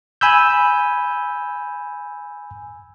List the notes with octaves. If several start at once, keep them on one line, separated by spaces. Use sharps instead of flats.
G#5 B5 E6 G6